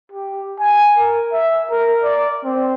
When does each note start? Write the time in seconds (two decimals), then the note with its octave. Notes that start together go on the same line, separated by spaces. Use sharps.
0.12 G4
0.59 G#5
0.97 A#4
1.32 E5
1.70 A#4
2.03 D5
2.44 C4